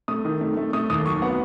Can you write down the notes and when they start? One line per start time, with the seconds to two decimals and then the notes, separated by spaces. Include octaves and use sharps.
0.08 A3 D#6
0.25 D#3
0.41 A3
0.57 A3
0.73 A3 D#6
0.90 D#2 D#6
1.06 F#3 C#6
1.22 B3 F#5